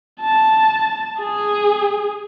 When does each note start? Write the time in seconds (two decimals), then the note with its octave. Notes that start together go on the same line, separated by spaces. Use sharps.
0.21 A5
1.20 G#4